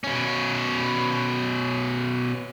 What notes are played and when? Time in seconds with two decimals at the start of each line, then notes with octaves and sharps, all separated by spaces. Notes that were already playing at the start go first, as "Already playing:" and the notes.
0.04 B2 C#4